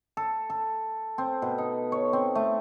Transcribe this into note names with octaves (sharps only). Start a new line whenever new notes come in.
A4
A4
C4
B2
D#4
C#5
C4
A3